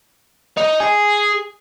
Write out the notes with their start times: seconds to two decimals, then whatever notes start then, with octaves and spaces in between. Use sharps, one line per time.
0.57 D#4
0.80 G#4